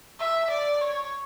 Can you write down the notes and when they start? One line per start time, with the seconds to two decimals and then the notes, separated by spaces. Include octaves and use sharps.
0.19 E5
0.51 D5
0.81 C#5